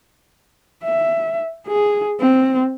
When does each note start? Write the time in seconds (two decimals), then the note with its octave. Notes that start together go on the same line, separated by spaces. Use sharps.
0.83 E5
1.68 G#4
2.19 C4